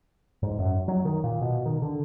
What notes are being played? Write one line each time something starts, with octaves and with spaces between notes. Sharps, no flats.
G#2
F#2
F#3
D#3
A#2
B2
D#3
D3